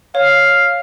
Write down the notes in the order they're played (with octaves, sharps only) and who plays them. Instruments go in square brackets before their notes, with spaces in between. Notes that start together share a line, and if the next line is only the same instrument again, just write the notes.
[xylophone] C#5 [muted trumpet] F5